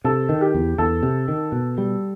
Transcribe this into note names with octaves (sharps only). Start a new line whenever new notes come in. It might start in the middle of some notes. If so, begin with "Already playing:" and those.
C3 A4
D#3
G4
E2
E2 A4
C3
D#3
B2
G3